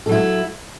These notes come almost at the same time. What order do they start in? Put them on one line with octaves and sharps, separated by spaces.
A4 F#3 E4